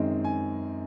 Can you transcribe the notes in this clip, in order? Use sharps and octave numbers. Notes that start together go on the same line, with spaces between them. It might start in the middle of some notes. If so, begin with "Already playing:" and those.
Already playing: F#2 D#3 G#3 C4 D#4
G#5